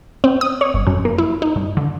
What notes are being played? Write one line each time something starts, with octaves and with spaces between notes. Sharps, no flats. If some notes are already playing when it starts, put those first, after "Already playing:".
C4
D#6
C#5
G1
F#2
A#3
E4
D#4
G2
D3